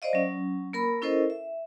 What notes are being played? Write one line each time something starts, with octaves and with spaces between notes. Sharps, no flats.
C5 D5 D#5 F5
F#3 C#4
A#3 A#4 B5
C#4 E4 A4 A#4 C5 D#5
E5